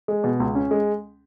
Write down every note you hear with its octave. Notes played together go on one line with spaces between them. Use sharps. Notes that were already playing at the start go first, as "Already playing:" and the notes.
G#3
B2
C#2
C#4
G#3